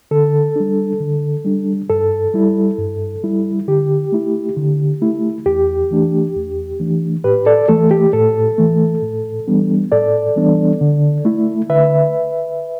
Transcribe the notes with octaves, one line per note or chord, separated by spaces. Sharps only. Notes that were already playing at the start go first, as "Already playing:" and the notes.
D3 A4
G3 D4
D3
G3 D4
G2 A4
G3 E4
G2
G3 E4
D3 G4
A3 E4
D3
A3 E4
E2 G4
E3 A3 D4
E2
E3 A3 D4
A2 G4 B4
A4 D5
E3 A3 A4
G4
A2 A4
E3 A3
A2
E3 G3 B3 D4
A2 A4 D5
E3 G3 B3 D4
D3
A3 E4
D3 B4 E5